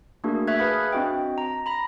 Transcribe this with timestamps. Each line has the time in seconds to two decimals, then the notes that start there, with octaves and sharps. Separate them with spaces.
0.24 A3 A#3 D4 F#4 G#4 A#4
0.47 E5 C#6 F#6 G#6
0.59 G#4 B4 F5 B5 D#6 F6
0.92 C4 D4 F#4 D#5 G5
1.38 A#5
1.66 A#5 B5 A#6